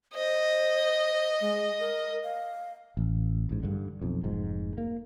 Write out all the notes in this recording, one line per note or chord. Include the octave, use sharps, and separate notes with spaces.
C5 D#5
G#3
A#4
F5
A1
A1 G#2
G2 D3
B1 F2
F1 G#2
A#3